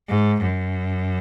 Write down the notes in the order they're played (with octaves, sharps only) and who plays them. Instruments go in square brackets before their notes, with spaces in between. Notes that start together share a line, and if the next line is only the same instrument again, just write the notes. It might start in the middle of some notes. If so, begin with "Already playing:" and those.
[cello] G#2
F#2